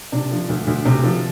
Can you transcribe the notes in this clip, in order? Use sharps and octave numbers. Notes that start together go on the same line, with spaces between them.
C3 D4
F3
D2
D2
C3
F3